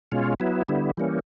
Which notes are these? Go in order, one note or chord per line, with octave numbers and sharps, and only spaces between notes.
B2 G#3 C#4 F4
F#3 B3 E4
D3 G3 B3 E4
E3 G3 A#3 C#4